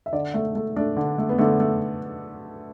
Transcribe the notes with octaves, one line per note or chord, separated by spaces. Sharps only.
E5
D3 D5
A3 E5
A3
A3 D4
D3
A3
B3
D3 A3
A3